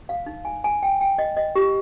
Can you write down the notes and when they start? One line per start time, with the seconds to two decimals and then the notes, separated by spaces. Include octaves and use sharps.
0.09 F5
0.26 D#4
0.45 G#5
0.64 G#5
0.83 G5
1.01 G5
1.18 D#5
1.37 D#5
1.56 G4